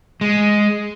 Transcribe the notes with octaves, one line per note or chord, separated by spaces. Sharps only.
G#3